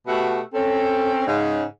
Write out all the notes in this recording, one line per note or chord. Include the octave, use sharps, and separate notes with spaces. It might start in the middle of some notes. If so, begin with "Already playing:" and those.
B2 A3 B3 F#4 G4 E5
C4 C#4 A4
G#2 C#3 D#4